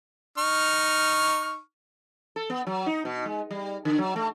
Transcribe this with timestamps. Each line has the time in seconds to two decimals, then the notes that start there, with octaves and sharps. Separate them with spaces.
0.38 D#4 C#6 F6
2.36 A4
2.50 B3
2.67 F#3
2.86 D#4
3.05 B2
3.25 G#3
3.51 G3
3.85 D3
3.98 F#3
4.16 A3